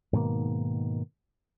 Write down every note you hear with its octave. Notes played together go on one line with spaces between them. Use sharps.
G#2 B2 D#3 A#3